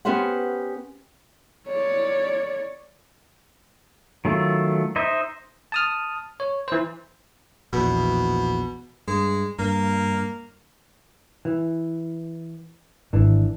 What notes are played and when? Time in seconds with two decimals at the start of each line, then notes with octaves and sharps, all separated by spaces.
0.05 B3 C#4 G4 B4 C5 F#5
1.68 C#5 D5
4.25 D#3 F#3 A3 F4
4.96 D#4 C5 D#5 E5
5.72 A5 D#6 F6
6.40 C#5
6.68 E3 C5
7.73 A#1 E2 B2
9.07 G2 G#3
9.58 G2 A#3
11.45 E3
13.13 G#1 E3 D4